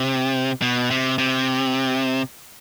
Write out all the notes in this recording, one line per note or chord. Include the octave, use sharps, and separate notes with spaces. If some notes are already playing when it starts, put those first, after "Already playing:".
Already playing: C3
B2
C3
C3